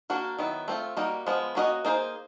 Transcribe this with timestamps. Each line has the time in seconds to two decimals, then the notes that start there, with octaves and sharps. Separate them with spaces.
0.10 A#3 D4 F#4 A#4
0.39 D#3 F#3 B3 E4
0.68 A3 C4 F4
0.97 G3 A#3 D#4 F#4
1.26 F3 G#3 B3
1.55 A#3 C#4 F#4 B4 D#5
1.85 A#3 D#4 G#4 C5